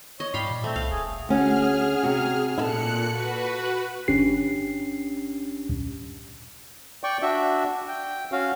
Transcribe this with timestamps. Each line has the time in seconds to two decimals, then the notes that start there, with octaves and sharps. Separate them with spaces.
0.20 C#5 D#5
0.34 G#2 G3 F5 B5 C6
0.51 A#2
0.64 A3 C4
0.76 C2 F5
0.91 E1 G#4
1.29 D2 C#4 F#4 G#4 F6
2.03 C3 F#4
2.58 A#2 E4 A4 A5 F#6 C#7
3.10 F#4 B4
4.08 G1 C#4 D4 G4 C7
7.04 D5 G5 C#6
7.22 D4 F#4 E5
7.88 G5
8.32 C#4 F#4 F5